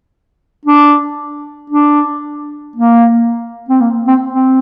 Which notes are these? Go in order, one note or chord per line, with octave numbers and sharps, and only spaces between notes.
D4
D4
A#3
C4
A#3
C4
C4